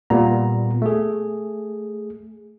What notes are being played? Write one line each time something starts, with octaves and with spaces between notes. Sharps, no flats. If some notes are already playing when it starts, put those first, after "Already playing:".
A#2 G3 A#3 B3 A#5
A3 G#4